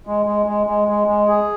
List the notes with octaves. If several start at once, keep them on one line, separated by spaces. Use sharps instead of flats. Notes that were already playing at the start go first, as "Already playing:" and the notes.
G#3
G#3
G#3
G#3
G#3
G#3
G#4